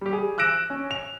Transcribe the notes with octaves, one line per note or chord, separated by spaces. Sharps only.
G3 G4
G#4
E6 F#6 A#6 D7 E7
C#4
F7